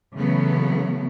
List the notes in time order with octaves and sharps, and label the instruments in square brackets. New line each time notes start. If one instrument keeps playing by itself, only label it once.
[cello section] C#3 E3 F#3 A3 B3